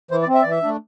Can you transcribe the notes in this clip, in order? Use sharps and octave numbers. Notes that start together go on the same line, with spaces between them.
E3 C5
D5
C4
E5
E3 D5
E5
A3 D4